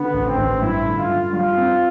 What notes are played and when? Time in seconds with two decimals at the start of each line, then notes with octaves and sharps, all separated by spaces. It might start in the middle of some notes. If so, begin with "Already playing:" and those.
Already playing: D3 B3
0.13 A1
0.25 C4
0.37 A1
0.62 G2 E4
0.85 D3
0.97 F4
1.09 G2
1.33 G3 F4
1.57 C4